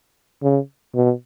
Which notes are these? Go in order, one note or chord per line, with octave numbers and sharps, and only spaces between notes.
C#3
B2